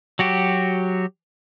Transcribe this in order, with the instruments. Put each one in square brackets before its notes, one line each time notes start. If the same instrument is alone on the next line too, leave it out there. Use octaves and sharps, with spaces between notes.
[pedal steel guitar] F#3 F#4 G4